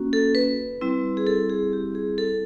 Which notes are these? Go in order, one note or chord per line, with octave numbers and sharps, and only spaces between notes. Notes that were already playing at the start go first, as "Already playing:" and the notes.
Already playing: A#3 C#4 F#4
A4
B4
G3 C4 E4
G#4
A4
G#4
G4
G#4
A4